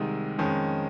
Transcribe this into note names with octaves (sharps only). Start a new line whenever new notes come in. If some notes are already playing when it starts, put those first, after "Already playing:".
Already playing: C2 C3 D#3 G#3 D#4
F2 D#3 G#3 C#4